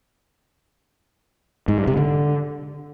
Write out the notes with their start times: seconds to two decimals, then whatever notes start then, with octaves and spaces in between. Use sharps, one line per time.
1.68 G#2
1.78 G2
1.87 C3
1.97 D3